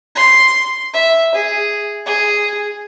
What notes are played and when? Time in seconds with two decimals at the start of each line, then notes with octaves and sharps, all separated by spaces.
0.15 C6
0.94 E5
1.34 G#4
2.06 G#4